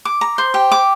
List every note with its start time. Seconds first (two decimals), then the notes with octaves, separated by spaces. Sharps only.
0.05 D6
0.21 A#5
0.38 C5
0.54 G4
0.72 D6